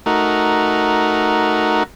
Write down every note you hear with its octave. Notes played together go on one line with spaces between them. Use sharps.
A3 D#4 F#4 A#4